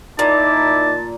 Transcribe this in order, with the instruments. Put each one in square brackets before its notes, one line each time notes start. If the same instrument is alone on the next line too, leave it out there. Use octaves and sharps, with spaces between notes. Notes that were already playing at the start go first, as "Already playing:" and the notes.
[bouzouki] A#2 [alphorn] D#4 [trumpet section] E4 D6 [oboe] A5